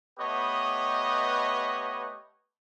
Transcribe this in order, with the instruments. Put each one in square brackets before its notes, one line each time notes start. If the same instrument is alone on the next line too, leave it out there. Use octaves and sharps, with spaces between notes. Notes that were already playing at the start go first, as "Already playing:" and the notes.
[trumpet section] A3 B3 G4 B4 C#5 D#5